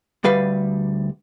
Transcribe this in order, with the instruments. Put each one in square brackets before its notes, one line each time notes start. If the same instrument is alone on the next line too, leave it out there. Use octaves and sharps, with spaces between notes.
[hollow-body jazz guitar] D2 G3 B4 F5